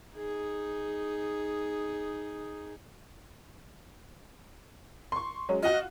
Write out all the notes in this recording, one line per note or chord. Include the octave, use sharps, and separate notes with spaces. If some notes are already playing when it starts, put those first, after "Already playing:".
D#4 G#4
C6 C#6
F#3 G#3 C#4
F4 F#4 D#5